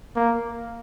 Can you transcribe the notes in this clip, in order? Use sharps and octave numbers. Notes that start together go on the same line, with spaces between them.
A#3